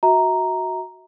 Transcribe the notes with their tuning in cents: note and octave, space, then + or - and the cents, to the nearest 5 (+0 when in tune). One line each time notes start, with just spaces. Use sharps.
F#4 +0 E5 -35 A#5 +0